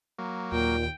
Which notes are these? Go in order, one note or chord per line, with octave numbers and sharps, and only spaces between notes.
F#3 A#3
D#2 A#2 G5